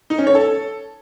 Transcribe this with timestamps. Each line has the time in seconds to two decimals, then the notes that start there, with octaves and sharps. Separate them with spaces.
0.10 D#4
0.18 C#4
0.27 C#5
0.35 A4